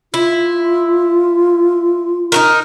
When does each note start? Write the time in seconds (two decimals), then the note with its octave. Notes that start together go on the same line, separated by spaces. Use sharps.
0.14 E4 F4
2.32 D#4 F#4 A#4